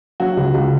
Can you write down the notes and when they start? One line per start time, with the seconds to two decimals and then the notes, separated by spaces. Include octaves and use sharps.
0.20 F#3 F#4
0.37 C#2
0.54 C#2